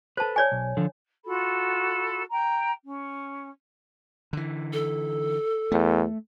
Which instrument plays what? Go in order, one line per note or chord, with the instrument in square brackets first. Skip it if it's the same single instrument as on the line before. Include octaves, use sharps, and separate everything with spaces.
[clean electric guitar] A4 B4 [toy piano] C5 A5
[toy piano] C#5 D5 G#5
[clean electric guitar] B1
D3 F3 A4
[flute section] F4 F#4 A4 B5
G5 A#5
C#4
[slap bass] D3 E3
[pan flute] A4
[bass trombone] E2 [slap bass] A3